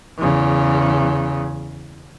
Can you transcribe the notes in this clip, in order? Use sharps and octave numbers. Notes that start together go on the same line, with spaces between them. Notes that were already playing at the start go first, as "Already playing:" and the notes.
E2 C#3